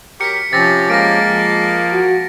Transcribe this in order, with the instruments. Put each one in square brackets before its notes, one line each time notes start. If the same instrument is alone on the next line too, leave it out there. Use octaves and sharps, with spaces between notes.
[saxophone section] F#3 G4 A#4 [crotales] B6 C#7
[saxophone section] C3 [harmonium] F3 C#4 G4 [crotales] A6 A#6
[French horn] G#3 [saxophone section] A#3 [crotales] A#6 D7
[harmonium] F3
[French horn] F#4